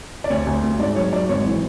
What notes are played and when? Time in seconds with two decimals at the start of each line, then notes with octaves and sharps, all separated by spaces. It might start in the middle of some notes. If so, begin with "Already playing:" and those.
0.24 D5
0.30 D2 C#5
0.47 D2
0.64 D2
0.79 G#2 D5
0.96 F#3 C#5
1.12 F#3 D5
1.29 G#1 C#5
1.46 E3